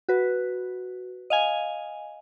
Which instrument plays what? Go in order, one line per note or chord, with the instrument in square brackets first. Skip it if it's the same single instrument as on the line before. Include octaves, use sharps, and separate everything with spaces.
[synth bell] F#4 B4
D#5 F5 G#5